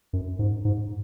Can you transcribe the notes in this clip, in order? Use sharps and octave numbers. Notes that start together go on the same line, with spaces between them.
F#2
G#2
G#2